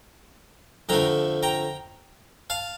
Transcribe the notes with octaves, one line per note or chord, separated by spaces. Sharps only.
F2 D3 F3 A3 G5 A#5
G5 A#5
F5 A5